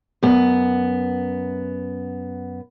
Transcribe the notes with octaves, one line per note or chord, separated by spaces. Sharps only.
F#2 B3